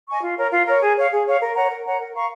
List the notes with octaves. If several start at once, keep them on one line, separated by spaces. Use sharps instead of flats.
D#5 G#5 C#6
F4
A#4 C#5
F4
A#4 C#5
G#4
C#5 F5
G#4
C#5 F5
A#4
C#5 F#5 A#5
A#4
C#5 F#5 A#5
A#4
F5 A#5 C#6